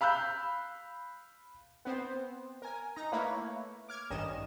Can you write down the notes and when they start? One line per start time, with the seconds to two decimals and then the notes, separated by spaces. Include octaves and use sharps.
0.01 F5 B5 E6 F#6 G6
1.85 B3 C4 C5
2.62 A#4 G#5
2.96 D#4 A#5
3.12 A3 A#3 E4 B4 C#5
3.89 D6 F6 G#6
4.11 A1 G2 D#3 C#4 D#5 E7